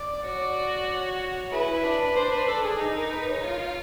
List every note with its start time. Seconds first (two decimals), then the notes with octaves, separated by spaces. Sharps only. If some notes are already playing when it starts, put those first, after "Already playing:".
Already playing: D5
0.23 F#4 C#5
0.40 D5
0.87 C#5
1.52 E4 G#4 B4
1.84 D4
2.16 D4 C5
2.32 B4
2.48 A4
2.63 G#4
2.79 D#4
2.96 A#4
3.11 B4
3.28 C#5
3.43 F4